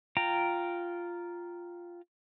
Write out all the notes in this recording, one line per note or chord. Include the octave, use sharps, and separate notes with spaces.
F4 G5 A#5